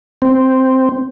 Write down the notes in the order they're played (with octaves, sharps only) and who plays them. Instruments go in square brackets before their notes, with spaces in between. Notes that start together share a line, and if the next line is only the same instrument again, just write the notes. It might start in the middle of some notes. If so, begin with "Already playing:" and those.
[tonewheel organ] C4